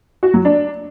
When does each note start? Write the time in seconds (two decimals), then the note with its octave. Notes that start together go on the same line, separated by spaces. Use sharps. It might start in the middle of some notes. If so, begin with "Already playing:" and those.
0.23 F#4
0.34 F#3
0.45 D4